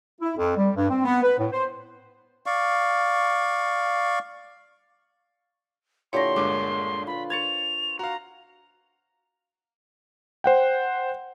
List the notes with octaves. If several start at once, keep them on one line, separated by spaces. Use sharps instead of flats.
E4
F2
G3
G2
C4
B3
B4
A2
C5
D5 F5 C#6
A#2 D3 E4 G4 C#5 C6 C#6 A#6
G1 G2 G#3 D6
F4 B4 B5
C5 C#5 G#6 A6 C#7 F7
F#4 F5 A#5
C5 F#5 G5